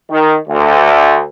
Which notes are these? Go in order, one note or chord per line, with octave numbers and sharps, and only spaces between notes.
D#3
D2